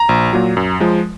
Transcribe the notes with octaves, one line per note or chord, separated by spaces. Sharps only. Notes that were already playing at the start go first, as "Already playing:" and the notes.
Already playing: A#5
A#1
A#2 F#3
F#2
F3 G#3